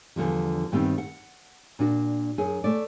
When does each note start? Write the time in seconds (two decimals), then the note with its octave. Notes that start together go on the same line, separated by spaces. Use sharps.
0.16 E2 D3 F3 G3
0.72 G2 D#3 G3 B3 C4
0.98 F#5
1.79 A#2 D4 F#4
2.38 F#2 G#4
2.64 A3 D5